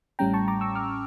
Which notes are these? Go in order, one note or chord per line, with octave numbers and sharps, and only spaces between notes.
A1 A2 G3 C#4 G5 A#5
A5 C#6
A#5 D6
C#6 E6
D6 F6